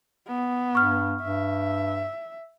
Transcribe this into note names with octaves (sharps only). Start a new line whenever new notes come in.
B3
G2 C#6 F6
G2 E5